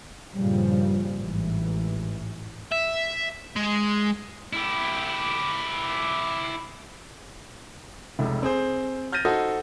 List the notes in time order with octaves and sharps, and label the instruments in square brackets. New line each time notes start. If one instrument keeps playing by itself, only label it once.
[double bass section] G2 A#2 C#3 F3 G3
A1 G#2 E3
[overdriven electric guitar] E5
G#3
[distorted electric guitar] E4 G4
[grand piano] F1 C#2
C4 G#4 C5
F6 G6 A6 A#6 D#7
D#4 F#4 A4 C5 D#5